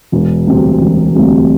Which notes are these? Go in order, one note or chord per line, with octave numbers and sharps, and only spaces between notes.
E1
D2 C3 G3 C4
E1
D2 C3 G3 C4